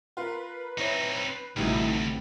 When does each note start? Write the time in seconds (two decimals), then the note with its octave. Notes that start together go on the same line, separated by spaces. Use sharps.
0.17 F4 A#4 B4
0.78 C4 D#4 E4 C#5
1.56 A1 D2 C3 G3 D#4 E4 F#4